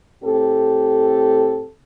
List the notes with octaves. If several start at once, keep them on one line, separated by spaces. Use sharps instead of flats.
A2 C4 G4 A4